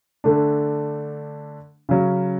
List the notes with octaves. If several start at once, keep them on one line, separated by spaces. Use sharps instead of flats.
D3 A3 D4
C#3 F#3 C#4